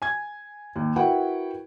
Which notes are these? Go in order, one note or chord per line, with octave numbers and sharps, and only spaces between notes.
G#5 G#6
D#2
E4 F#4 A#4 B4 F#5 G5